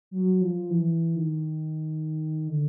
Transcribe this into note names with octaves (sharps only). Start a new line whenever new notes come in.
F#3
F3
E3
D#3
D3